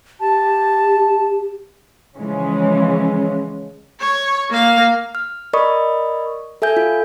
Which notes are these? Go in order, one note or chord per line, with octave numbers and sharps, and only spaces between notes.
G4 A5
C#3 E3 F3 G#3 C#4
C#5
A#3 F5
F6
A#4 D5 D#5 B5 C#6 D#6
A4 E5 G#5 G6
F4